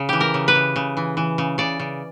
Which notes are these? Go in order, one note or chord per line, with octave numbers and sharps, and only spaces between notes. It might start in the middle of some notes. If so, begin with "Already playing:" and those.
Already playing: C#3
E3 G4
A#4
C#3
B4
C#3
C#3
E3
E3
C#3
C#3 D5
C#3